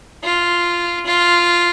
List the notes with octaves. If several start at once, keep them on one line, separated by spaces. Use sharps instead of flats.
F4
F4